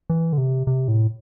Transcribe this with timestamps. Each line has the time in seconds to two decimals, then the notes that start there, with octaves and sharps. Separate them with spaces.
0.10 E3
0.33 D3
0.38 C3
0.67 C3
0.88 A2